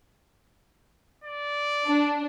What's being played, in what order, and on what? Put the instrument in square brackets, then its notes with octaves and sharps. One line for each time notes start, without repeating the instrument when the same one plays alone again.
[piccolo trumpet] D5
[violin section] D4